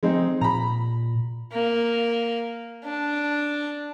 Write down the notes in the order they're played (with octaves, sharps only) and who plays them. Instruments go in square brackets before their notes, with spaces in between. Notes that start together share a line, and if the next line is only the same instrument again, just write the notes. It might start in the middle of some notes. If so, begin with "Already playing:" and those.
[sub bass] F3 [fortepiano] G#3 C4 D#4
[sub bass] A#2 [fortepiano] A#5 B5
[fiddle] A#3
D4